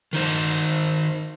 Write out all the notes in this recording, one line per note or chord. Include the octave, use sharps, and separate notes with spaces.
D#3 D#4 C5